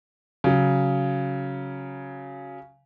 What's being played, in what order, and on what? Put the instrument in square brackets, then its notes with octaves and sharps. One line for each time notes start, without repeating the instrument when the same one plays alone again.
[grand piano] C#3 F#3